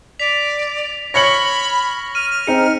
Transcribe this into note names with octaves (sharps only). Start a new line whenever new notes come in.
D5 B6 F7
C#5 B5 F6 A#6 C#7 F#7
F6 D#7
C4 D#4 G#4 C#7